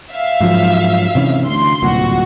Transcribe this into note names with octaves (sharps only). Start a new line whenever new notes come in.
E5 F5
G#2 F3 F#3
C3 E3 C#4
D2 C6
D1 C2 A#2 F#4